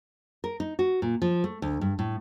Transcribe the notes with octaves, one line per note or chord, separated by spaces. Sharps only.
A#4
D#4
F#4
A#2
F3
A3
D2
G2
A2